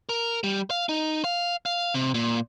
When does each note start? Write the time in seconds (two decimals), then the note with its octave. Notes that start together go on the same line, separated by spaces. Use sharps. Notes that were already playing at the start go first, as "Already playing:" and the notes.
0.09 A#4
0.44 G3
0.70 F5
0.89 D#4
1.24 F5
1.66 F5
1.94 C3
2.14 A#2